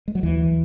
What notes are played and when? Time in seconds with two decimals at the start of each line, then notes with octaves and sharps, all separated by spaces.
0.08 G#3
0.15 F#3
0.23 D#2 E3